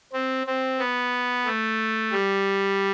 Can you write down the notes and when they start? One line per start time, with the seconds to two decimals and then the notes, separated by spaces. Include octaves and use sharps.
0.13 C4
0.46 C4
0.79 B3
1.46 A3
2.12 G3